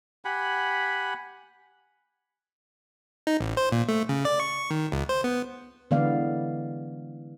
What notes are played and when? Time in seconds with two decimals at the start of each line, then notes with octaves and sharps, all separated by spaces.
0.25 G4 F#5 G#5 B5
3.27 D#4
3.41 A1
3.57 C5
3.72 A#2
3.89 A3
4.09 C#3
4.25 D5
4.40 C#6
4.70 D#3
4.92 C#2
5.09 C5
5.24 B3
5.91 D3 E3 G#3 B3 D5 F5